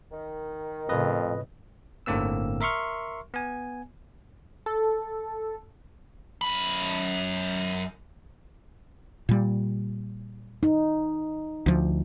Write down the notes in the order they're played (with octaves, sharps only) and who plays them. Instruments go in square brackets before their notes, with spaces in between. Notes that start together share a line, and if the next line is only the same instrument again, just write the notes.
[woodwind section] D#3
[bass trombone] F2 [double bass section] A2 C#3 [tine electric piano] B4 D#5
[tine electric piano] G1 A2 D3 A#3 C4 E6
A#4 E5 C6 C#6 F6
B3 G#5
[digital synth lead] A4
[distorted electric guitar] F#2 B5
[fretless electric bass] A#2 G3
[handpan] D#4
[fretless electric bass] D2 F3